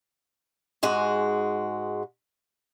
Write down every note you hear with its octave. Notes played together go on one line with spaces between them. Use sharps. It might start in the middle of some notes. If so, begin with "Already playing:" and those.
G#2 G#3 F#4